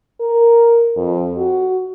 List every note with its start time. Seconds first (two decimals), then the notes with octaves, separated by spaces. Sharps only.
0.20 A#4
0.96 F2
1.37 F#4